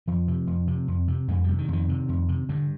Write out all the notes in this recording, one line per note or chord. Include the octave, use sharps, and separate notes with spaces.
F2 F3
C3
F2
C3
F2
C3
F2 G#3
C3 G3
D#3
F2 D#3
C3
F2
C3
G2 D3